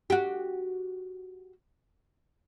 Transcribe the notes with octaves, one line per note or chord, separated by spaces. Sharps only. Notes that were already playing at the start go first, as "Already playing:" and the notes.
F#4 G4